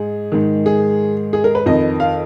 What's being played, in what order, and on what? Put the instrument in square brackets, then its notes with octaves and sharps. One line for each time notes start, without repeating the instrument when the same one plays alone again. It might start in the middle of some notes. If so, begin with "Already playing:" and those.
Already playing: [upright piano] G#2 G#4
G#2 D#3
G#4
G#4
A#4
B4
F2 D#3 D#5
F5